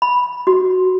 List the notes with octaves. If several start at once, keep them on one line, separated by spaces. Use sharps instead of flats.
B5
F#4